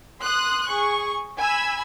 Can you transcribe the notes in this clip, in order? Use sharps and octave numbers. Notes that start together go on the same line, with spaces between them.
C6 D#6 F#6
G#4 C#6
G#5 B5 E6